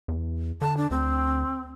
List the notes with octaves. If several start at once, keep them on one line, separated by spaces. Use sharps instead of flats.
E2
D3 A5
D4
D2 C4